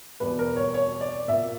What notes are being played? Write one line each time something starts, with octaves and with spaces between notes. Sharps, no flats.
E2 B2 G3 B4
A#4
C#5
C#5
D5
A#2 A#3 E5